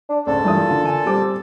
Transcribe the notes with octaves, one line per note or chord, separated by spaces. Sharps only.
D4
C#2 G#2 D4 A4
G2 A#2 E3 D#6
D3 F4
G#5
G3 C4 D6